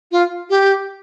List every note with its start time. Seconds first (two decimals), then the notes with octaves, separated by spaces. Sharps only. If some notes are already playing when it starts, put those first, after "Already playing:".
0.12 F4
0.50 G4